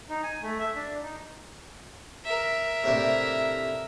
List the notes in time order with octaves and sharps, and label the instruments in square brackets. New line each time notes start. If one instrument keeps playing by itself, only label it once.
[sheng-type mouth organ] D#4
G#5
A3
E5
D4
D#4
[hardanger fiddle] A#4 E5
[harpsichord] A2 C3 D4